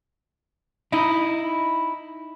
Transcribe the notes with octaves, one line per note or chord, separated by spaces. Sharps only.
D#4 E4